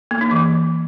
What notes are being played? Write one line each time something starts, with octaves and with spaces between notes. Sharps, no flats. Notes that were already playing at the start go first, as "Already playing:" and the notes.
A#3
D#4
E3